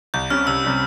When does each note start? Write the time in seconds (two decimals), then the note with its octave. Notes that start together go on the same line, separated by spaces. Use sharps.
0.14 C2 G6
0.30 C3 G3 C#4 F6
0.47 C2 E6
0.64 C3 G3 C#4